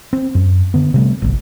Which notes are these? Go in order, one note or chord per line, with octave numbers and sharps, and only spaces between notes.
C4
F#2
D3 B3
C3 G3 A3
G1 C2